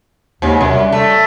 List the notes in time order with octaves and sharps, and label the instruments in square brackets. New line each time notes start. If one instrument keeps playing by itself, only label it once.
[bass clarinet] D#2 [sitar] G#2 C#3
[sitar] F#2 [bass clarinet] C3
[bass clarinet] G3
[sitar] A3